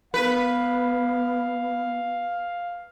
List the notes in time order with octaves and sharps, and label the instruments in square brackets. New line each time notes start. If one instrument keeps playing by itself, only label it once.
[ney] B3 [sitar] B4 [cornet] F5